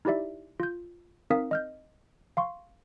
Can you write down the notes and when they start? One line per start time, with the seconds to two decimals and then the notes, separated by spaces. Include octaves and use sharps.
0.05 D#4 E4 G4 D5 E5
0.60 F4 G6
1.30 C4 D#4 A#4 F5 D#6 B6
1.51 D#5 F6 G6
2.37 F5 C6 C#6